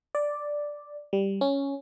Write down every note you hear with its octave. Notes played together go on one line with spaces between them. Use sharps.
D5
G3
C#4